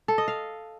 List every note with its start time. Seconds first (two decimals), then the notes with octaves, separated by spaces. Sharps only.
0.08 A4
0.18 D#5
0.28 F5